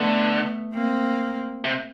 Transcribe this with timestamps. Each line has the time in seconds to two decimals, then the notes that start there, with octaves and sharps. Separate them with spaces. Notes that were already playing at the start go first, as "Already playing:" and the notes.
Already playing: D3 A3 B3
0.74 A#3 C4
1.64 C3